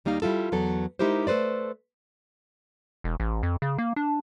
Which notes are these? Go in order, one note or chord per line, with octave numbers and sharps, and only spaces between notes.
D#2 G3 A#3 D#4 F5
G3 E4 F4 A4
E2 F#3 B3 A4
G#3 D#4 E4 G4 A#4 C5
A3 A4 B4 C5 D5
E1
A1
F2
C#3
A#3
D4